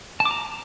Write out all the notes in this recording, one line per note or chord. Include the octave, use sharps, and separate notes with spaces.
A5
D6
A#5